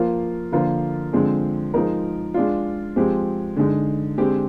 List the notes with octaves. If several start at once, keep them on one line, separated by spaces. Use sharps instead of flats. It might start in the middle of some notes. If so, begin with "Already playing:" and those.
Already playing: F3 A#3 F4
D3 F3 A#3 F4 A#4
D3 F3 G#3 C4
F3 G#3 D#4 A#4
G#3 D4 F4
F3 G#3 C4 G4
D3 G#3 D#4
D3 G#3 C4 G4